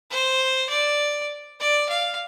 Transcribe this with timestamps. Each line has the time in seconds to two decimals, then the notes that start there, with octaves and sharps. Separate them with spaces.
0.10 C5
0.69 D5
1.59 D5
1.88 F5